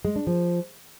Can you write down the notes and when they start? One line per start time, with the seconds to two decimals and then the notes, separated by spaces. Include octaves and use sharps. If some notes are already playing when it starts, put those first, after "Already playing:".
0.05 G#3
0.16 D4
0.27 F3